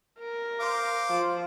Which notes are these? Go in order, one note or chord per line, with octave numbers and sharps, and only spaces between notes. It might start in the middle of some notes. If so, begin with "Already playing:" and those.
A#4
C5 F5 D6
F3